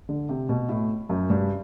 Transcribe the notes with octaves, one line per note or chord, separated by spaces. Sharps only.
D3
C3
B2
A2
F#2
G2